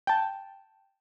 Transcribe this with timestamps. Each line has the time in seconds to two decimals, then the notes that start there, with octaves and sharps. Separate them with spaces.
0.07 G5 A5